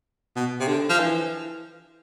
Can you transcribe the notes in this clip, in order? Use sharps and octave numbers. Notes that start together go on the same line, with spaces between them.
B2
C3
D3
F3
E3